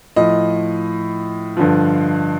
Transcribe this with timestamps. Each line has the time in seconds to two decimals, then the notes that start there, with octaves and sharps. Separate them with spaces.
0.16 A2 F3 D#5
1.57 G2 D3 F3